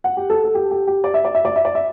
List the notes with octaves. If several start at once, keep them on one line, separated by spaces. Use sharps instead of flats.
F#5
G4
A4
A4
G4
G4
G4
D5
E5
D5
E5
D5
E5
D5
E5